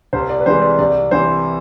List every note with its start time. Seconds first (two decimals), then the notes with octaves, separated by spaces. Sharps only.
0.13 C2 C5
0.29 D5
0.40 B4
0.46 C3 E3 G#3 C5
0.62 D5
0.79 C2 D5
1.11 C3 E3 C5